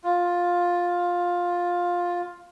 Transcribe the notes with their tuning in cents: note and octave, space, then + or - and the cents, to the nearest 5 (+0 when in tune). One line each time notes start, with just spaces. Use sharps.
F4 +10